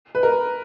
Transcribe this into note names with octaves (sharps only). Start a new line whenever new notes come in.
B4
A#4